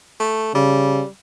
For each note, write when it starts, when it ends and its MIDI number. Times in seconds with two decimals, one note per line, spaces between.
0.20 0.53 57
0.55 1.03 49
0.55 1.07 55